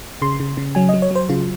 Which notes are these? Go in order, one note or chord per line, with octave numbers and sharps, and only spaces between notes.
C#3 C6
C#3
C#3
F#3 G#5
D#5
F#3
C#5
F#3 C5
C#3 F4